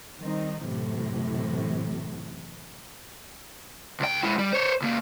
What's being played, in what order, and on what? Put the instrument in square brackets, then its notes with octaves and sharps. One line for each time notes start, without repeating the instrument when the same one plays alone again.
[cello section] D#3 G3 C4 D#4
F#2 A2 C3 E3
[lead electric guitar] C#2 G5
G#3 E4
G3
C5 C#5
C#2 A#3